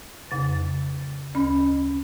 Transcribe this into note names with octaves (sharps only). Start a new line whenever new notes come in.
F2 C#3 A6
D2 C#4 B5